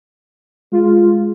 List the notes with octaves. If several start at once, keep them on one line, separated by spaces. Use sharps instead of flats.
G#3 F4